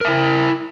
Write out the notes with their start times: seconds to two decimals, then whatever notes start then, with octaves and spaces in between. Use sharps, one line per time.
0.01 A#4
0.05 E5
0.08 E4